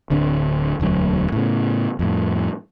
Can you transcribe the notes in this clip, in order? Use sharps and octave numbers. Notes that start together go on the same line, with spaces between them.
D1 D3 C4 D4
E1 D2 A2 F#3
A2 C#3
F2 A2